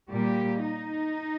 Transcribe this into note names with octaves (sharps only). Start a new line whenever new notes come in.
A#2 G3 A#3 G4
D#4